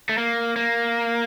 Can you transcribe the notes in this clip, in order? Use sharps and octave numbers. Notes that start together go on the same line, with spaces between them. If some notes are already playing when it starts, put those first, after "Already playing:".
A3
A#3
A#3